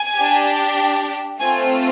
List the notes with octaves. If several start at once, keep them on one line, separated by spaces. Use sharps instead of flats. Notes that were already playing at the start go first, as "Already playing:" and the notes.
Already playing: G#5
D4 G4
A3 C4 F4 G#5